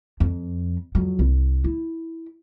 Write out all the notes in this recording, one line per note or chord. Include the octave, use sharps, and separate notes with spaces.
F2
F2 F#3
C2
E4